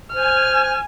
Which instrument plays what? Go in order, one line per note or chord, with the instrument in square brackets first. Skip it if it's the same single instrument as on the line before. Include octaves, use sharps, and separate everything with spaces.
[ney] C5 [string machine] G#5 [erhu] F6